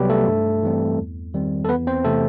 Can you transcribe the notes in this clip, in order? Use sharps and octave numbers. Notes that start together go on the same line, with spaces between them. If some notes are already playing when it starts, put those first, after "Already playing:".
Already playing: C2 C3 F#3 G3 B3 G4 B4
A3 A4
G2
E3 G3 C4
E2
D#3 G3 C4
A4
E2 B3 B4
C4 C5
C3 E3 A3 A4